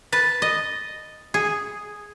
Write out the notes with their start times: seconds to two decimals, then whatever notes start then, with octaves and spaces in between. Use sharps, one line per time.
0.13 B4 A5
0.42 D#5
1.34 G#4